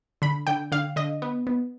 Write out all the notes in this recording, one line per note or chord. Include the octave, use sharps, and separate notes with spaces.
D3 B5
D3 G5
D3 F5
D3 D#5
B3
B3